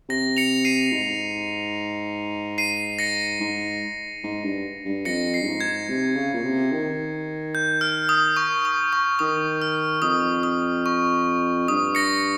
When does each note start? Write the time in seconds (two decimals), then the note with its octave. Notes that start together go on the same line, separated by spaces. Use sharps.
0.09 C3 A#6
0.37 C#7 F7
0.65 C7 D#7
0.92 G#2
2.58 C7 D#7
2.99 A#6 C#7
3.40 G#2
4.23 G#2
4.44 G2
4.85 G2
5.05 F2 A#6 C#7
5.34 C7
5.41 G2
5.47 G#2
5.61 G#6
5.89 C3
6.16 C#3
6.34 A#2
6.44 C3
6.72 D#3
7.55 G6
7.81 F6
8.09 D#6
8.37 C#6
8.65 D#6
8.93 C#6
9.19 D#3 D#6
9.62 F6
10.02 F2 D#6
10.43 D#6
10.86 C#6
11.68 G2 D#6
11.95 A#6 C#7